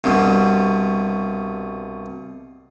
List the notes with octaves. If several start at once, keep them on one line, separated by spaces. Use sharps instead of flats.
C2 G2 B2